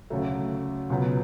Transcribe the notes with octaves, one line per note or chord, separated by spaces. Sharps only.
D2 C#3 F#3 A3
C#2 B2 F#3 B3